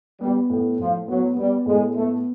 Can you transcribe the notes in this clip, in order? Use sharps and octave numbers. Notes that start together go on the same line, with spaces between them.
G3 B3
A2
A2 F3
F#3 B3
G3 B3
A2 G#3
A3 B3